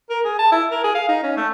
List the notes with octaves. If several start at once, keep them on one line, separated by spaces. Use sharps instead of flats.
A#4
G#4
A5
E4
A#4
G#4
F5
D#4
C#4
A3